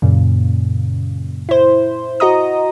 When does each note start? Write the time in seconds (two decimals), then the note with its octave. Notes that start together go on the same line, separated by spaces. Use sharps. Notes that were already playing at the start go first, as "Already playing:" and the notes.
0.02 F#2 A#2 C#3
1.49 E4 C5
2.20 F#4 D#5 A#5 D#6